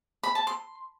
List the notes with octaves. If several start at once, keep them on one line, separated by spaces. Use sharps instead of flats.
B5
A5
C6